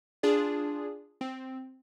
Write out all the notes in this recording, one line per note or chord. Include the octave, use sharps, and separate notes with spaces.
D4 F4 G#4 D5
C4